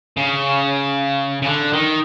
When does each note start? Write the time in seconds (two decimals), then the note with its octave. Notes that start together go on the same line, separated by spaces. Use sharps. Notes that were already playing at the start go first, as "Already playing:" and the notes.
0.17 C#3
1.42 C#3
1.46 D3
1.73 D#3